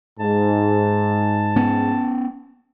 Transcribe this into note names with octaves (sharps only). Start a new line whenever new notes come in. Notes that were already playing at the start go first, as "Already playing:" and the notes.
G#2 A5
B3 C#4